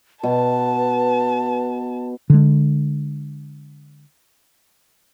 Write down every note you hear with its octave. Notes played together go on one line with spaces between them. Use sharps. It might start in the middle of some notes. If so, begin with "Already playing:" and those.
B2 B4 A5
D3 G#3